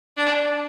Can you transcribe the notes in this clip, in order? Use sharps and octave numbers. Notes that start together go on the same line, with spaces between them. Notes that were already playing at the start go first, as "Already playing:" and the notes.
D4